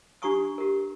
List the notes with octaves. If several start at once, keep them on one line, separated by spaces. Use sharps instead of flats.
D4 G4 A#5 C#6 D#6
G4 A#4